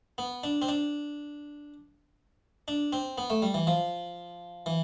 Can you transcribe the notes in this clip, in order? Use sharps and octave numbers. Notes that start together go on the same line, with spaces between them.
B3
D4
C4
D4
D4
C4
B3
A3
G3
E3
F3
E3